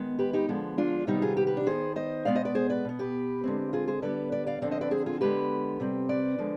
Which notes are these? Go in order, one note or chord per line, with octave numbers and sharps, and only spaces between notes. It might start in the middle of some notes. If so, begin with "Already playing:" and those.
Already playing: D#3 G#3 B3
G4 B4
D#4 G4
D3 F3 G#3 B3
D4 F4
C3 D#3 G3 B3 D#4 G4
F4 G#4
G4 B4
G4 B4
D4
D#3 B3 G#4 C5
C5 D#5
B2 G#3 B3 D5 F5
C5 D#5
B4 D5
G#4 C5
B4 D5
B2 B3
G4 B4
D3 G#3 C4
F4 G#4
G#4 C5
D3 G3 B3 B4 D5
B4 D5
D5 F5
D3 F3 C4 D5 F5
C5 D#5
B4 D5
G#4 C5
F4 G#4
D3 G#3 B3 G4 B4
C3 G3 C4
B4 D5
D3 F3 G#3